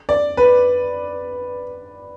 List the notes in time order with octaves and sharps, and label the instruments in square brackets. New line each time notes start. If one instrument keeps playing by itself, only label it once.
[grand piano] D5
B4